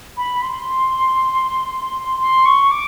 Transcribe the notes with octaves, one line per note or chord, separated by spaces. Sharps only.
B5
C6
C6
C#6
D6